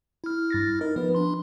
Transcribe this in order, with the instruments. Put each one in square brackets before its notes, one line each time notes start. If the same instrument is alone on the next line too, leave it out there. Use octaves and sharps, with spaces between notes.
[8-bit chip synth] E4 F6
[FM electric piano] G2 A6 A#6
[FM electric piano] D#4 [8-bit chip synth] A#4
[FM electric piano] F3 B4 [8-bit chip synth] B3
[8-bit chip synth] D4 C6